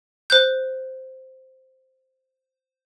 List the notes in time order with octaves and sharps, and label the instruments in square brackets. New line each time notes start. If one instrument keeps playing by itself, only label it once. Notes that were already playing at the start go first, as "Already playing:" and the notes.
[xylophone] C5 F#6 G6